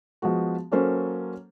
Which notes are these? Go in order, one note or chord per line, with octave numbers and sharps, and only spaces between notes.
F3 G#3 B3 F#4
F#3 A#3 C#4 A4 C5